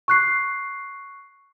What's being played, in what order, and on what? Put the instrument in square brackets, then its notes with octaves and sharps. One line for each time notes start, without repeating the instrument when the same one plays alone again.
[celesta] C#6 F#6 C7